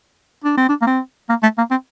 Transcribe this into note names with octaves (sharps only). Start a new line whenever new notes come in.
D4
C4
D4
A#3
C4
A#3
A3
A#3
C4